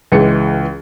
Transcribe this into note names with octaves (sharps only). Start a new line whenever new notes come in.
C#2 E3 G#3 C#7